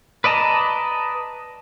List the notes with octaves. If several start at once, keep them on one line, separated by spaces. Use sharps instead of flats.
B4 D5 D#5 A5 A#5